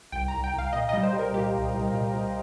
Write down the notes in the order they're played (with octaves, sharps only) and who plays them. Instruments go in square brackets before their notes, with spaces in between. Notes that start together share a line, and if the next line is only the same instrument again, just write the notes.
[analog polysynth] C2 G5
A#5
C2
G5
C2
F5
A#2 D#5
G3 D#5
C5
G3
A#4
A#2 G4
C2
C2
A#2
A#2